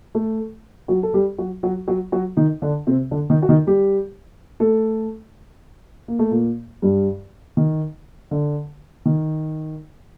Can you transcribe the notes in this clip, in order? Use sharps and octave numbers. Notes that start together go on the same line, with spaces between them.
A3 A4
F#3 F#4
A4
G3 G4
F#3 F#4
F#3 F#4
F#3 F#4
F#3 F#4
D#3 D#4
D3 D4
C3 C4
D3 D4
D#3 D#4
F#4
D#3 D#4
G3 G4
A3 A4
A#3
A3
A#2 A#3
G2 G3
D#3
D3
D#3